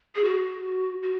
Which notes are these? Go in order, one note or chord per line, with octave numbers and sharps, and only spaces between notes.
G#4
F#4
F#4